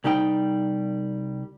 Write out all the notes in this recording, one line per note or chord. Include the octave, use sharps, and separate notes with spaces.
C2 G3 D#4 G5